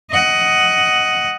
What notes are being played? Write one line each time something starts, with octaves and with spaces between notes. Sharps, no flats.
D#5 F#5